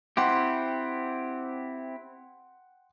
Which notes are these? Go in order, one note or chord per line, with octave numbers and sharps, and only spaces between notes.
C4 E4 G4 F#5 G5 C6